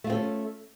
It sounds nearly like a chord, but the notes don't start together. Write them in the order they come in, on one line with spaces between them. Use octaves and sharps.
A3 F4 C4 A4 C#4